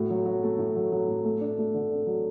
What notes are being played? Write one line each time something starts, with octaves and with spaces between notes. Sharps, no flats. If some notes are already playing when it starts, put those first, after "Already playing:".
Already playing: A2 F#4
F#3
F#3
A3
A2
F#3
F#3
A2
A3
D4
A3
D3
D4
F#3